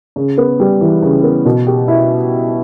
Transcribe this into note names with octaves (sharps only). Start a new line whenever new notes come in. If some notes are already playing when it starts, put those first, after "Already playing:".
C#3
B3
G3
E3
C#3
B3
B2
G4
E4